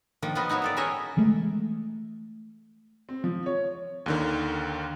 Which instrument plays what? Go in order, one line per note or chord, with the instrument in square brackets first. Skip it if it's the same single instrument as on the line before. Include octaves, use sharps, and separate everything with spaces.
[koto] D#3 F3 A#3 D4
F3 B3 F4 F#4 B4 D#5
D#4 E4 F#4 C#5
G3 A4 D5
C#4 G#4 A#4 C#5 D#5 E5
[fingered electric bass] E3 G#3 A3
[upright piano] C4
F3
C#5
[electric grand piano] D#2 D3 D#3